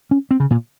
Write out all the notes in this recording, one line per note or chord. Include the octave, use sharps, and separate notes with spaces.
C#4
C4
C#3
A#2